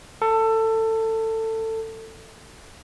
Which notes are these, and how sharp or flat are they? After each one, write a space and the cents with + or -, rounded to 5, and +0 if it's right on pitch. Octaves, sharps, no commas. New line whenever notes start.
A4 +20